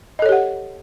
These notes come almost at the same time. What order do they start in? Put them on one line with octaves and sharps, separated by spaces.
D#5 A4 C#5 G4 F#5